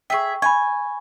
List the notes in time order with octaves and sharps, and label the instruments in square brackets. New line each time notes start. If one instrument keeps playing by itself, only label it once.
[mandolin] G#4 E5 [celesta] G5 C#6
[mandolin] G#5 [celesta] B5 C#6